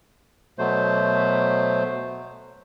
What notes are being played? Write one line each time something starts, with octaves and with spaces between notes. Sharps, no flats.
B2 F#3 A3 C5